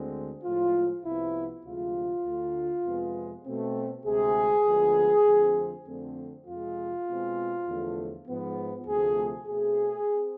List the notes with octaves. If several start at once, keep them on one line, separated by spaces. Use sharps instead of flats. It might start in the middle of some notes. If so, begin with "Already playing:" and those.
Already playing: D2 D3 G#3 C4
A2 F3 G#3 F4
C2 C3 F3 B3 E4
D2 C3 F3 G#3 F4
D2 D3 A3
F2 C3 G#3 B3
B2 A3 C4
D2 C3 G#3 G#4
D2 D3 F3 G#3 B3
F2 D3 F3 A3 C4
F2 D3 F3 A3 C4
F2 C3 G#3 F4
B2 G#3 C4
E2 D3 F3 A3
G#2 F3 B3
D2 C3 F3 A3 C4 G#4
B2 A3 C4 G#4
C4